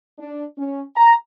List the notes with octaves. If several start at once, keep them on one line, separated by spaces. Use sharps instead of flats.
D4
C#4
A#5